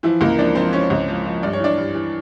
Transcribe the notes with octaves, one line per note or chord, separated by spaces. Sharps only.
E3 F3 E4
C#2 A#3 A#4
F3 D4 D5
F3 C4 C5
F3 C#4 C#5
C#2
F3
F3
G2 D5
C#5
E3 D4 D5
G2
E3